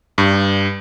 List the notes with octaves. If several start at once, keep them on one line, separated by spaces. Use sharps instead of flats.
G2